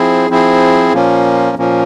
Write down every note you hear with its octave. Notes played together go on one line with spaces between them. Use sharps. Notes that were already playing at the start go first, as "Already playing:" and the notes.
Already playing: F3 C4 E4 G#4
F3 C4 E4 G#4
A#2 F3 A#3 C#4
A#2 F3 A#3 C#4